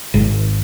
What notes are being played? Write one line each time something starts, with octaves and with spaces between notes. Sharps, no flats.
G#1